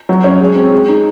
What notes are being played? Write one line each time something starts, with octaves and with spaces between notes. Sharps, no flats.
F#3
C#4
G#3
C4
G#3
D#4